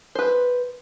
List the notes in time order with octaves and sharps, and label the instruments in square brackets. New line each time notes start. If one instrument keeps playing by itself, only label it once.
[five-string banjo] B4 C5